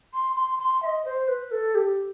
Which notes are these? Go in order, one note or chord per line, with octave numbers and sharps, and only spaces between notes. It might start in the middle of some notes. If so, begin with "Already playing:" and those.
C6
C6
C6
E5
D#5
C5
B4
A4
G4